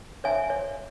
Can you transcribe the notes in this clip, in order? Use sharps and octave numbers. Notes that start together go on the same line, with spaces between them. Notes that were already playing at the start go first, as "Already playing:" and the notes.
C#5 E5 G#5
C#5